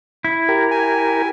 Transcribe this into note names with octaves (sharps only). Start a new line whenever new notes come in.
E4
G4 A#4
G#5